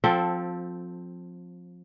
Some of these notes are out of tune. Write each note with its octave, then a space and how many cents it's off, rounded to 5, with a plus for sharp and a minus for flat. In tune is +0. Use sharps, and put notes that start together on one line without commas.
F3 +20 C4 +0 A4 +0